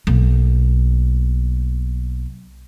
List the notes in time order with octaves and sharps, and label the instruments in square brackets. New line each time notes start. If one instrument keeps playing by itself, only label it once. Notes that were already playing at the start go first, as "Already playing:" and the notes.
[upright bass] B1 A#3